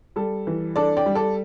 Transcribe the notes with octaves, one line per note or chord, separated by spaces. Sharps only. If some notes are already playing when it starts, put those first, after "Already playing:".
G3 A4
E3
D4 A4 D5
D5 G5
G3
A4 D5